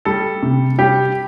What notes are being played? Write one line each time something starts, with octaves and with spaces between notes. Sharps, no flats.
G3 A4
C3
G3 G4